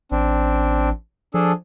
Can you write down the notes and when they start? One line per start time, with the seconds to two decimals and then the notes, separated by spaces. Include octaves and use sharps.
0.11 A1 C4 D4
1.34 F3 D4 G#4 A4